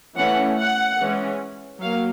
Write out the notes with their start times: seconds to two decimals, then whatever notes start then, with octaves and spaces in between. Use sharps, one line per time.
0.17 E3 A3 C#4 F#5
0.59 F#5
0.99 E3 G#3 C#4
1.81 F#3 A#3 F5